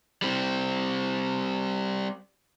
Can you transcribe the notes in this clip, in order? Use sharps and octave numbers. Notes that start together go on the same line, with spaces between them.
G3 C4